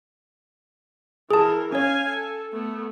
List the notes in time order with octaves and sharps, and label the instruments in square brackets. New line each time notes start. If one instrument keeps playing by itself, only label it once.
[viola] E3 A#4 [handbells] G#4 A5
[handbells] C#4 C#5 [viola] F5 G#5
[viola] A4
A3 B3